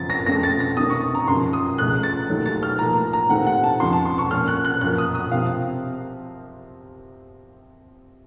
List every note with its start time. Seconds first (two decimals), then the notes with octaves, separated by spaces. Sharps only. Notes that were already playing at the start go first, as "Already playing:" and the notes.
Already playing: F#2 C#3 F3 C4 A6
0.10 A#6
0.26 F2 C#3 F3 A3 A#6
0.43 A6
0.60 A#6
0.77 C3 D#3 A#3 C#4 D#6
0.90 C#6
1.15 A#5
1.27 F#2 C#3 F3 C6
1.53 D#6
1.78 C#2 C#3 F3 A3 F#6
2.03 A6
2.29 D#2 D#3 F#3 A3
2.46 A6
2.63 F6
2.79 A2 F3 A#3 A#5
3.13 A#5
3.29 D#2 D#3 A3 C4 F#5
3.47 F#5
3.64 A5
3.80 F2 C#3 F3 C6
3.93 A5
4.05 C6
4.18 C#6
4.31 A#2 F3 A#3 C#4 F6
4.48 F#6
4.64 F#6
4.81 F#2 F3 A#3 F#6
4.98 D#6
5.15 D#6
5.32 C3 F3 C4 F5